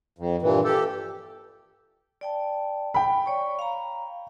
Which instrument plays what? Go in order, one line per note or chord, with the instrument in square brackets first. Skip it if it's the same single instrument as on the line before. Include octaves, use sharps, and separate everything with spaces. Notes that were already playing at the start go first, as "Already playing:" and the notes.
[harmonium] F2
G2 A#2 E3
G4 A4
[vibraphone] D5 G5 A5
[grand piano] G5 B5
[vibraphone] C#5 D5 C#6
F5 A#5